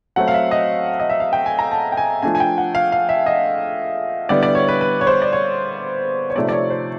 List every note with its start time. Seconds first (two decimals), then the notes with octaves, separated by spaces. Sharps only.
0.16 F#3 A3 C4 F#5
0.28 F5
0.34 E5
0.51 D#5
1.00 D#5
1.10 E5
1.20 F5
1.33 G5
1.46 G#5
1.59 A#5
1.71 A5
1.92 G5
1.97 G#5
2.22 F3 A3 D4 G#5
2.35 G#5
2.40 G5
2.58 F#5
2.75 F5
2.92 F5
3.09 E5
3.26 D#5
4.29 D3 G3 B3 E4 D5
4.43 D5
4.55 C#5
4.68 B4
4.81 B4
5.01 C#5
5.07 C5
5.22 D5
5.33 C#5
6.30 C#5
6.36 C3 F3 A3 C4 D#4 D5
6.49 D5
6.53 C#5
6.70 C5